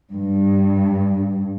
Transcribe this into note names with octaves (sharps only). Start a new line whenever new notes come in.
G2